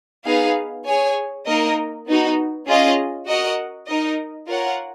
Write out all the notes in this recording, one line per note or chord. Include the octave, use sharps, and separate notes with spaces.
B3 D#4 G#4 B4 F5
G#4 C#5 G#5
A#3 D#4 A#4 D#5
B3 D#4 F#4
C#4 F4 G#4 D#5
F#4 A#4 D#5 F#5
D#4 A#4 D#5
F4 A#4 C#5 F#5